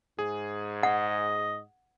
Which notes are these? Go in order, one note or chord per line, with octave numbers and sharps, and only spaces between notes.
G#2 G#4
D#5 F#5